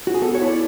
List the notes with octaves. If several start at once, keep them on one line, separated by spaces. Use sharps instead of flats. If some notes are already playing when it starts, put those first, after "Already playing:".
F#4
G#4
B3 A4
C#5
E4
D5